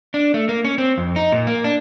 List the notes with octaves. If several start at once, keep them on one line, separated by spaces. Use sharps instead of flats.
D4
A3
A#3
C#4
C4
F2
D#4
A#2
A#3
D4